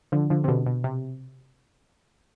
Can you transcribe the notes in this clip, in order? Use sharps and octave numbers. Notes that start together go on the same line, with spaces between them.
D3 F3
D3 F3
C3
B2 D3
B2
C3